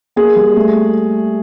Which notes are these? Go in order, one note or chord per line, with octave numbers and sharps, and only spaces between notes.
A#3 G#4
G3
A3